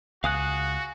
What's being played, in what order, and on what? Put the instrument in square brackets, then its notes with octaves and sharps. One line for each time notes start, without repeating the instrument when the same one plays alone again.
[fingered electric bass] C#2 [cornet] F#4 [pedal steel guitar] F5 D#6 F#6 [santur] G#5